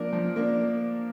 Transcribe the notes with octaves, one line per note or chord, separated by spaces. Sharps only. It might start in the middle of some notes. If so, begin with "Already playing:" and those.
Already playing: F3 A#3 D4 A#4
F3
A#3 D4